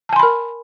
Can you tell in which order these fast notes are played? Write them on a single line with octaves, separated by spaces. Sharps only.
A5 G#5 C6 B5 A#4